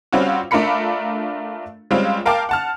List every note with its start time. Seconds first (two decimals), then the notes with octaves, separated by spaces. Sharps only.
0.12 G3 C4 C#4 F4 F#4
0.51 A3 D4 F4 A#4 B5 C#7
1.91 G3 G#3 C4 C#4 F4
2.26 A#4 F5 G5 A5 D6
2.49 F#5 A5 F6